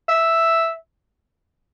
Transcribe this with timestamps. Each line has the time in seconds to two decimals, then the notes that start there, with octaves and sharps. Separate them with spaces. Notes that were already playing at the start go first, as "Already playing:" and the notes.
0.09 E5